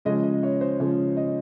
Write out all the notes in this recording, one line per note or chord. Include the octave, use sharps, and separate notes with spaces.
C#3 F3 G#3 C#4 D#5
D#5
C#5
C5
C#3 F3 G#3 C#4 C#5
D#5